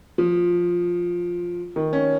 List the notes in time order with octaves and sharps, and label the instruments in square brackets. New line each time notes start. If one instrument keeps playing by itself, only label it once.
[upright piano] F3
D#3
C#4